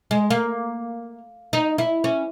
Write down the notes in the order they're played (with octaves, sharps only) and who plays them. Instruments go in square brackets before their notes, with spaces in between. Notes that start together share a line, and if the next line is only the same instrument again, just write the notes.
[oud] G#3
A#3
D#4
E4
C#4